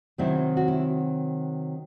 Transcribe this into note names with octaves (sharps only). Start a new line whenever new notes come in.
C3 D#3 F#3 C4 E4
F#4
E4